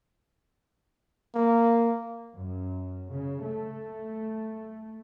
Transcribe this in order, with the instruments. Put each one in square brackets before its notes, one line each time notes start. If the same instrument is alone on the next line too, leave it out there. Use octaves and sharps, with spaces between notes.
[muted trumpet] A#3
[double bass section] F#2
C#3
A3